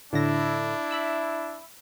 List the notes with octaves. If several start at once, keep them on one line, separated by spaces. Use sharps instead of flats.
A2 D3 D4 E4 A#6
E5 B5 E6